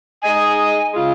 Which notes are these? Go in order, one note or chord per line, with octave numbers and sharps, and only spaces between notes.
G#3 D#4 G#4 D#5 G#5
C#3 G#3 F4